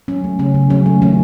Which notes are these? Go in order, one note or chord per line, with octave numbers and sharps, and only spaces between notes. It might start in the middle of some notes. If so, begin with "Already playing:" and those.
F#3 C#4
A3
C#3 C#4
C#3
F#3 C#4
A3
D#3 C#4